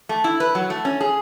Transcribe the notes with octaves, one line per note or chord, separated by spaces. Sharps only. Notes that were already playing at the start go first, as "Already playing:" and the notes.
A3
E4
B4
F#3
A3
C#4
G#4